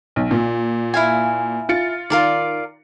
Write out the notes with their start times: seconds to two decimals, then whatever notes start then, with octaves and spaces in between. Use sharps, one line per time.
0.16 B1
0.31 A#2
0.94 E4 F5 G#5
1.69 F4 A6 C#7
2.10 D#3 F4 A#4 D5